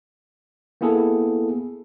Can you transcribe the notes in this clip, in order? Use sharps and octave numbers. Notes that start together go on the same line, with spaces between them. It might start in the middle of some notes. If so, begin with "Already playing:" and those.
A#3 B3 E4 G#4 A4